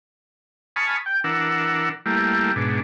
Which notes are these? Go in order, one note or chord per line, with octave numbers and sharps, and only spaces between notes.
G#5 A5 B5 C#6 D#6 F6
G5
E3 D4 A#4 F#5 E6
G3 A3 A#3 E4
G#2 B2 D4